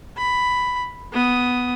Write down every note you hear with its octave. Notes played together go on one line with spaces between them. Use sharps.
B5
B3 D#6